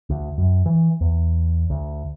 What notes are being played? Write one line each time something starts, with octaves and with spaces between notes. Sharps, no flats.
D2
F#2
E3
E2
D2